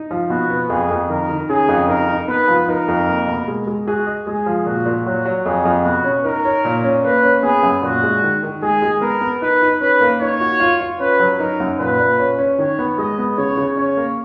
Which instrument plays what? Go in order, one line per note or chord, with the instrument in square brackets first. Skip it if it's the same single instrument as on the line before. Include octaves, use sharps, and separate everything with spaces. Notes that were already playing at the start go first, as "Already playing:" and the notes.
Already playing: [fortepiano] D#4
F3
[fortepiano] B2 [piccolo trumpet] F#4
[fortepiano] B3
[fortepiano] F2 [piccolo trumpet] G#4
[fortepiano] F2
[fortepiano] D#3 [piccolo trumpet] A#4
[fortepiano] D#3
[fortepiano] C#3 [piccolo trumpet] G#4
[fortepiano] F2
[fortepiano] D#4 [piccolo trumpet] A#4
[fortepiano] D#4
[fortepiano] B3 [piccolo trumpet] B4
[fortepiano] F3
[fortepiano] D#4 [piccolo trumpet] A#4
[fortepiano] F2
A#3
B2
G#3
G#3
[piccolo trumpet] F#4 [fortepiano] G#4
[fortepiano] D#5
[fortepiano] G#3 [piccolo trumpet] G#4
[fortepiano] F3
[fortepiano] A#2 [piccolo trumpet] F#4
[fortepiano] A#2
[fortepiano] F#3 [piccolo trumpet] F#4
[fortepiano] F#3
[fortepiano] F2 [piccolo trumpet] G#4
[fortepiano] F2
[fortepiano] B2 [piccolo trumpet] F#4
[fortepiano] C#4
[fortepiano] D#4 [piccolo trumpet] A#4
[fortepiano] C#5
A#2
C#4
[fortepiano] A#3 [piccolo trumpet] B4
[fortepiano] C#4
[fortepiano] B3 [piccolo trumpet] G#4
[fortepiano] F#2
[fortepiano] A#2 [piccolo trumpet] F#4
[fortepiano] G#3
D#3
D#3
[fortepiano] G#3 [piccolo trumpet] G#4
[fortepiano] G#3
[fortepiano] B3 [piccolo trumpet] A#4
[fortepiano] B3
[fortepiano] D#4 [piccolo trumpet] B4
[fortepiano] D#4
[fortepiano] C#4 [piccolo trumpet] B4
[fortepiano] A#3
[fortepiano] D#4 [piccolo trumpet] C#5
[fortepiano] F#4
F4
F4
[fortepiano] C#4 [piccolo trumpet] B4
[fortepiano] F#3
[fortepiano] D#4 [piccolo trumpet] A#4
[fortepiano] F#2
[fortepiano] A#2 [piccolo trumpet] B4
[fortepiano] A#2
C#4
C#4
[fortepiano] D#3 [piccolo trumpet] C#5
[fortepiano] B3
[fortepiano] G#3 [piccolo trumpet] D#5
[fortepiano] B3
[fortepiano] C#3 [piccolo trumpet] C#5
[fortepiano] C#3
[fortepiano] C#4 [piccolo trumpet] C#5
[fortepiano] A#3